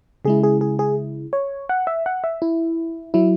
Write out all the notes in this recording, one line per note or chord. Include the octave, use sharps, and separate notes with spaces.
C#3 G#3 E4 G#4
G#4
G#4
G#4
C#5
F#5
E5
F#5
E5
E4
F#3 E4